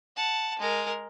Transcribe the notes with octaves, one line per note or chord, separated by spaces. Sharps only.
F#5 A5
G#3 A#4